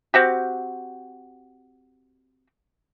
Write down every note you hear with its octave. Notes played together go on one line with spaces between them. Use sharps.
C4 F#4 G4